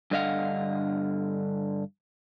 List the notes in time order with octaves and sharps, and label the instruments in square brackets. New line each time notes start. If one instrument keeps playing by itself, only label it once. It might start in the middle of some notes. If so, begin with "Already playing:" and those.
[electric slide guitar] G2 D3 D#5 F5 F#5